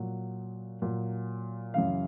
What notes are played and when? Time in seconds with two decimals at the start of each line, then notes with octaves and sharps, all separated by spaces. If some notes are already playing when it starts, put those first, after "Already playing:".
Already playing: A#2 F#3
0.82 A#2 F#3
1.73 F#2 C#3 E3 F5